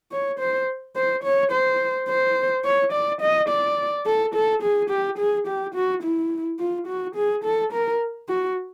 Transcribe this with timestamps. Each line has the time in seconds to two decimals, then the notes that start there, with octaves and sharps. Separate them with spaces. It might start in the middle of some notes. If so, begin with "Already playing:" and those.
0.12 C#5
0.39 C5
0.96 C5
1.24 C#5
1.52 C5
2.09 C5
2.65 C#5
2.93 D5
3.21 D#5
3.49 D5
4.06 A4
4.35 A4
4.63 G#4
4.90 G4
5.19 G#4
5.47 G4
5.75 F#4
6.03 E4
6.59 F4
6.87 F#4
7.16 G#4
7.44 A4
7.73 A#4
8.29 F#4